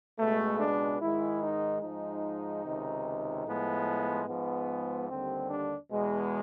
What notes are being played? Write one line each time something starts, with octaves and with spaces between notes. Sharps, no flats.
C#2 B2 G#3 A3
D4
G#2 D#3 G#3 E4
D#4
G#2 F3 G#3 D#4
C#2 C3 D#3
A2 F3 G#3 B3
G#2 F3 G#3 B3
D#2 D3 G3 C4
D4
E2 B2 G#3